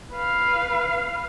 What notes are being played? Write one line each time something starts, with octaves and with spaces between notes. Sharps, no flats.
B4 F5